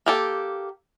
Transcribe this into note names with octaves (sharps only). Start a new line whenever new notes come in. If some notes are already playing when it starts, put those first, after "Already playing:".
A#3 G4 A4